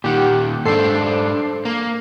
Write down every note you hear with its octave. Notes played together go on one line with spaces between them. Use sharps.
A#2 D#3 G4 F#5
G#2 D4 A4 C5 C7
A#3